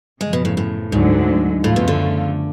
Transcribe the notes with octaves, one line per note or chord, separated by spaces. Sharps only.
F#2 C#3 F3 G#3
B2
A2
A2
D2 G#2 D3 F#3
F#2 A2 C#3 F3 A3 F4
B2
D3